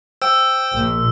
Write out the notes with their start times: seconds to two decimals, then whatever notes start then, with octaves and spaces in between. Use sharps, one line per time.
0.22 C5 G5 E6
0.73 A#1 A#2